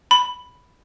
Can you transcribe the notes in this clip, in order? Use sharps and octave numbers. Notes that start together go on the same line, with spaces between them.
B5